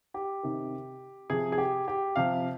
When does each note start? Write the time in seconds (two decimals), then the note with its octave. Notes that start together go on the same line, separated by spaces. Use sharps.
0.14 G4
0.43 C3 D#3
1.30 C3 F3 G#4
1.52 G#4
1.58 G4
1.88 G4
2.16 C3 F3 F5